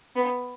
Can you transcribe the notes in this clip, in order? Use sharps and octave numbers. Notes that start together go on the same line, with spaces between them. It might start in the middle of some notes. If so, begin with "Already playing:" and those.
B3